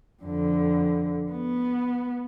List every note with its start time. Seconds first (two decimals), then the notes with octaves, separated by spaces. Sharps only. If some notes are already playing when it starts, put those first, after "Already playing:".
0.23 F2 D3
1.32 B3